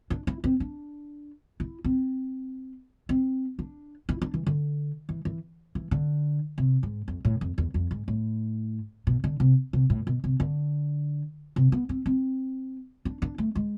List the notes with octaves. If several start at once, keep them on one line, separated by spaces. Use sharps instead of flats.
D4
E4
C4
D4
E4
C4
C4
D4
E4
D4
E3
D3
E3
E3
E3
D3
C3
G#2
F2
A2
F2
E2
F2
G#2
A2
B2
D3
C3
C3
A2
B2
C3
D3
C3
B3
C4
C4
D4
D4
A3
G#3